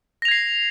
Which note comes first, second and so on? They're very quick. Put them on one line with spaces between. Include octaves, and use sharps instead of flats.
A#6 F7 G#6 C7